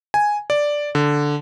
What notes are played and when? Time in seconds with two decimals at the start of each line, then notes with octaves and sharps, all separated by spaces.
0.14 G#5
0.50 D5
0.95 D3